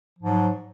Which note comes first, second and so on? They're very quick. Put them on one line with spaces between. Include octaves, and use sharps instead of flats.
F3 G#2 F#3